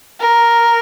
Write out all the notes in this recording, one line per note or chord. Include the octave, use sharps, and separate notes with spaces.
A#4